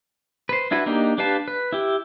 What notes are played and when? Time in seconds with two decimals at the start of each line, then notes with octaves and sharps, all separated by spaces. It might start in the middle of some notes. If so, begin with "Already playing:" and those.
0.49 B4 C5
0.71 D4 E4 F#4 B4
0.86 A#3 D4 D#4 G4
1.18 D4 G4 B4 F5 A5
1.48 B4
1.72 E4 G4